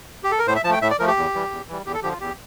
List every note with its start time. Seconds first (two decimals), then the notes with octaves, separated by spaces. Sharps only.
0.24 G4
0.31 A4
0.39 A#4
0.47 A2 C5
0.56 E5
0.64 F3 A5
0.69 A3 G5
0.82 A2 E5
0.91 D5
0.99 F3 A3 A#4
1.07 G4
1.17 E2
1.34 E3 G3
1.51 E2
1.68 E3 G3
1.86 E2 G4
1.94 A4
2.03 D3 F3 G4
2.12 F4
2.20 E2 G4